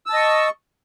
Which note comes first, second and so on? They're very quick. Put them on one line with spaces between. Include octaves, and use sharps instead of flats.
E6 A5 D#5 C#6